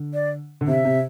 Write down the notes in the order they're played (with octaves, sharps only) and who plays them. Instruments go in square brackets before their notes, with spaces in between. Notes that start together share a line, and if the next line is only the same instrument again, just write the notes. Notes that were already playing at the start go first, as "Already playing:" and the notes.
Already playing: [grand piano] D3
[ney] D5
[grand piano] D3
[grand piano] C3 [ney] E5
[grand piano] C3